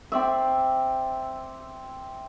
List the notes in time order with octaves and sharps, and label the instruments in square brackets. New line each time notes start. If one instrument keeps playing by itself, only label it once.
[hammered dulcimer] C4 D5 E5